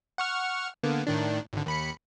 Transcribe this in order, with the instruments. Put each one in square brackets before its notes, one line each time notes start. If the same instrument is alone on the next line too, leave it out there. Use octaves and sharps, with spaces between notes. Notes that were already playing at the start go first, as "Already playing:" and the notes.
[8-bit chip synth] F#5 C#6 F6
D3 A#3 B3
A2 D#3 D4
G#1 D3
D#2 B5 C#7